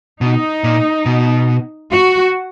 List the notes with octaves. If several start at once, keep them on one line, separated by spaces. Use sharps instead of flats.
B2 D#4
A#2
B2
F#4